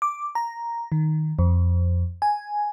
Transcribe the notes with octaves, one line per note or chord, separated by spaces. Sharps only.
D6
A#5
D#3
F2
G#5